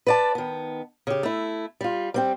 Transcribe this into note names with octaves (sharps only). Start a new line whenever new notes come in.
B4 D5 A5
D#3 B3
C#3 G4
A3 E4
G3 F4
G3 C4 G5